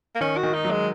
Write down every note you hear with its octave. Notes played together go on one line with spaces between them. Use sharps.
A#3
D#3 C#4
F#4
D#3
D#4
F#3
G#3